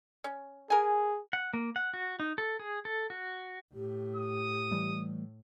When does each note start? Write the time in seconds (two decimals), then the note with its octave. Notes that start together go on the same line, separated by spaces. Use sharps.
0.24 C#4
0.70 G#4 A#4 G#5
1.33 F#5
1.54 A#3
1.76 F#5
1.94 F#4
2.20 D#4
2.38 A4
2.59 G#4
2.85 A4
3.10 F#4
3.74 A2 G4
4.16 D#6
4.71 E3 G3 A3